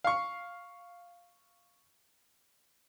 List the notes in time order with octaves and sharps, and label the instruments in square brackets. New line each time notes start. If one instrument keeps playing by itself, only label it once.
[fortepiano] F5 C#6